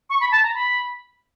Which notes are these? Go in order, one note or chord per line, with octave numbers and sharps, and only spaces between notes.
C#6
B5
A5
A#5
B5